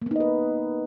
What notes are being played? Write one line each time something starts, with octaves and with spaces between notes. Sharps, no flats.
A#3 B3 D#4 B4 D#5